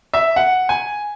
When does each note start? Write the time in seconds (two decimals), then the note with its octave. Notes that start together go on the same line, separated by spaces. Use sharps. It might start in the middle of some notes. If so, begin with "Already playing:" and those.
0.14 E5
0.36 F#5
0.69 G#5